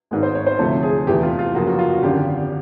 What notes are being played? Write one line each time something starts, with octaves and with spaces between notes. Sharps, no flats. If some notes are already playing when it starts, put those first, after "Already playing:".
G#1 G#2 D#3 G#3 B3
C5
C#5
C5
D2 C3 F3 A3 A4
G#4
E2 C3 E3 A3 G4
F4
F4
F#2 C#3 F3 A#3 F#4
F#4
F4
F#4
G#1 F#2 D3 G4